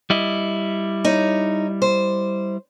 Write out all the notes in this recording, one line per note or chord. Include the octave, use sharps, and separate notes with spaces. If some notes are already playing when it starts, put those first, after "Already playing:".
G3 E4 D#5
D#4 C#5
C5